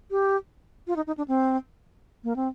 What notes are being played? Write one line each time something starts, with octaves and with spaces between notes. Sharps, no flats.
G4
F4
D#4
D#4
D4
C4
A#3
C4